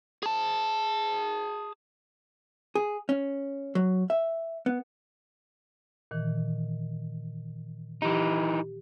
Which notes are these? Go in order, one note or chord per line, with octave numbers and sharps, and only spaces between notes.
G#4 A5
G#4
C#4
F#3
E5
B3
A#2 D#3 E3
E3 D#4 G4